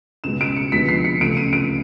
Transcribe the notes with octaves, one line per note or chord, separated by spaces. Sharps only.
C#2 B2 G#3 E7
D7
C#7
D2 C3 F3 G#3 B3 B6
C7
C#7
C#2 C3 E3 A3 D7
D#7
D7